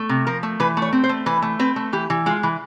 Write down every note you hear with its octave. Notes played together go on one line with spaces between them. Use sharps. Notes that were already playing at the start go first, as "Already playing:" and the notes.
Already playing: A3
C3
F3 A#4
A3
E3 B4
A3
C#5
C4
C5
A3
E3 B4
A3
C4 B4
A3
E3 G4
E3
G#3 F4
E3